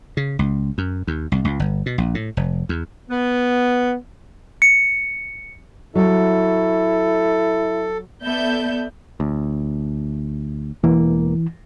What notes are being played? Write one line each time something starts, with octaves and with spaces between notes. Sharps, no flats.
C#3
C#2
F#2
D#2
C2
C#2
G1
B2
A#1
A2
F1
E2
B3
C#7
F#3 E4 A4
B3 A4 D5 E5 G6
D2
E1 E3 A#3